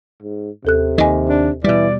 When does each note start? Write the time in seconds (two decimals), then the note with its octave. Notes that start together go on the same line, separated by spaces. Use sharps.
0.23 G#2
0.65 D#2 C3 A4 F#6
0.98 D#2 D#3 D#5 G#5
1.29 D4
1.64 B2 E3 G3 D5